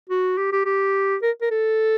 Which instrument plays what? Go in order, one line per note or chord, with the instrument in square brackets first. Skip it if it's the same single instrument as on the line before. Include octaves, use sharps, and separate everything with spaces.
[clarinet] F#4
G4
G4
G4
A#4
A#4
A4